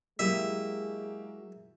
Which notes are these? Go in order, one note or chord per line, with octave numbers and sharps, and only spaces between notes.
F#3 G#3 A#3 E4 G4 D#5 E5